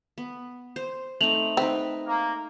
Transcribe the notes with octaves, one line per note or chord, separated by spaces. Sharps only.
B3
C5
A3 C4 D#4 F7 F#7
C4 D#4 B4
A#3